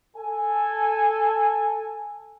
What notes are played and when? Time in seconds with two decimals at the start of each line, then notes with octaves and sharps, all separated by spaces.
0.17 A4 G#5